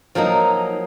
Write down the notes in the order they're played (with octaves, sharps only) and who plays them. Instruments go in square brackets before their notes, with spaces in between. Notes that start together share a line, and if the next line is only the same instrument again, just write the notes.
[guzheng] F3 F#3 A#3 D#4